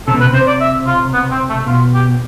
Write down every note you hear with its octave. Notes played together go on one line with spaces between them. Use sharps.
C3 A4
B2
C3 B4
C3 C5
D5
E5
F4
B3
C4
A3
B2 F4
G4